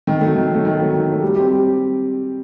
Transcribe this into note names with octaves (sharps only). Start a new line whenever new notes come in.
D#3
F#3 A3
D#3
F#3 A3
D#3
F#3 A3
D#3
F#3 A3
G3
C4 G4
G3